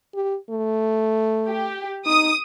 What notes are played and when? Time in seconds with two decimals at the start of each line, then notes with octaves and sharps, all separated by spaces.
0.14 G4
0.50 A3
1.47 G4
2.06 D#4 D#6